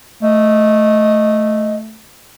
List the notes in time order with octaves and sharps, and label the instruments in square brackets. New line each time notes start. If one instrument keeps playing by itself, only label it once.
[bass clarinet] A3 [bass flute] D#5